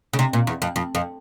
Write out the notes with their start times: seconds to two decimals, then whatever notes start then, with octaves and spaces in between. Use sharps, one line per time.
0.13 C#3
0.19 C3
0.33 A#2
0.47 E2
0.62 F2
0.76 F2
0.95 F2